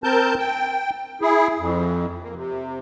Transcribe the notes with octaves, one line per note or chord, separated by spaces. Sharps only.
C4 A#4 A5 G6
G5
E4 G#4
F2
A#3
C3